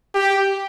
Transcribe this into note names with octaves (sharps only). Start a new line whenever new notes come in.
G4